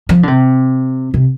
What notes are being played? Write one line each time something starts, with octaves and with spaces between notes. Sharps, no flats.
F3
D3
C3
C3